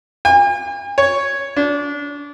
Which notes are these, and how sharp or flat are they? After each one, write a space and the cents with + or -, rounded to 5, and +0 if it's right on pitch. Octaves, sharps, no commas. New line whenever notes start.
G#5 -45
C#5 +0
D4 -25